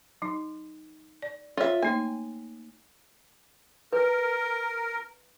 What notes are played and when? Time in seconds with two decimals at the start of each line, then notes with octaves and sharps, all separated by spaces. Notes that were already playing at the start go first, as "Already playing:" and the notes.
0.22 F#3 D#4
1.22 D5
1.57 F4 C#5 E5
1.82 A3 A#3 D#4 G#5
3.93 A#4 B4